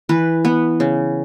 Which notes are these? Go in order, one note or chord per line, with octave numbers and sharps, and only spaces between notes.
E3 B4
B3
C#3